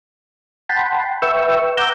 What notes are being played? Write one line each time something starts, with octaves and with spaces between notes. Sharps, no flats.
F#5 G5 A5 B5 C6
B4 E5 G5 C#6 E6
F#5 A#5 D6 E6 G6